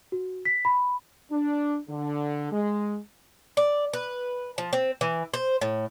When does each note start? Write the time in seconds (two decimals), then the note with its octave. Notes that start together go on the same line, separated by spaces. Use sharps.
0.12 F#4
0.45 B6
0.65 B5
1.31 D4
1.89 D3
2.52 G#3
3.57 D5
3.93 B4
4.58 F3
4.73 C4
5.01 E3
5.34 C5
5.61 A2